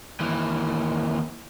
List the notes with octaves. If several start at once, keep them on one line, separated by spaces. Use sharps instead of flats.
D#2 E3